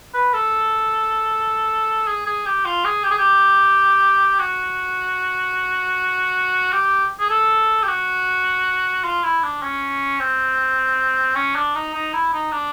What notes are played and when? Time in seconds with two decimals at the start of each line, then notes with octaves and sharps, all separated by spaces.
0.14 B4
0.34 A4
2.07 G#4
2.26 G#4
2.46 G4
2.65 F4
2.85 G#4
3.04 G4
3.11 G#4
3.19 G4
4.39 F#4
6.72 G4
7.20 G#4
7.30 A4
7.83 G4
7.88 F#4
9.04 F4
9.23 E4
9.43 D4
9.62 C#4
10.20 C4
11.36 C#4
11.56 D4
11.75 D#4
11.94 D#4
12.13 E4
12.33 D#4
12.52 D4